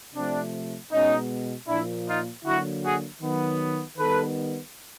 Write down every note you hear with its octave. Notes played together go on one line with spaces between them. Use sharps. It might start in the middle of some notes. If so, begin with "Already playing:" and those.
C3 F3 A3 C4 D4
B2 G#3 B3 C#4 D#4
A#2 F3 A#3 D4 E4
D#4 F4
D3 F#3 A#3 E4 F#4
F#4 G#4
D#3 F#3 B3
D#3 G3 B3 A4 B4